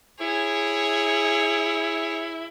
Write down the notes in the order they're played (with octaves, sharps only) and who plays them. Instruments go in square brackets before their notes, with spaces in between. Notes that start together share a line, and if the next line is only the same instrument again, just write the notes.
[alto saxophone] E4 [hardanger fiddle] G#4 C#5